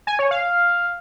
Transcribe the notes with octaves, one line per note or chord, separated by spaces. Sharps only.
G#5
C#5
F5